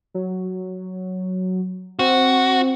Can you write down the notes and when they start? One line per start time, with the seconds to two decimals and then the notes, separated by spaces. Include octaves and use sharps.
0.14 F#3
1.99 C4 F#4